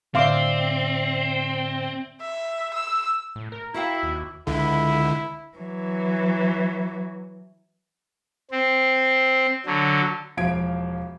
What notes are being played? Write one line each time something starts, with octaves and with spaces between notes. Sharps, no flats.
A2 D3 C4 D5 E5 F5 C6 D6
E5
E6
A2
A#4
E4 F#4 F5 G5
D#2
C#2 D3 E4
E3 F#3
C4
D3 F#3
E1 F3 F5 G#6 D7